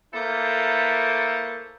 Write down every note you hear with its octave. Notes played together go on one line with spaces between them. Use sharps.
A3 A#3 E4 A4 B4 C5